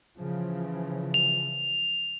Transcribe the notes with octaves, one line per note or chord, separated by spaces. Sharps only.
C#3 E3 F3
F7